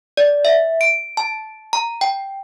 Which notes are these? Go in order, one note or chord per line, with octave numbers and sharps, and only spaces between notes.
D5
E5
D7
A5
A#5
G5